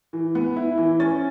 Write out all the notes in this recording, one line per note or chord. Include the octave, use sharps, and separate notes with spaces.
E3
B3
E4
E3
C#4 A6